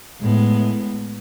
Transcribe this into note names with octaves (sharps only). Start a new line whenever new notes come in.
A2 G#3 B3